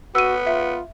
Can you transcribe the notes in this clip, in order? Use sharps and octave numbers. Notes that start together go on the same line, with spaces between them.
B3 F#4 E6 D#7
F4 E5 C#7